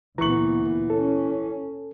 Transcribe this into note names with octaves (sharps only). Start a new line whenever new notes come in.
D2 A#2 E3 B3 A#5 C#6 F#7
C#4 A4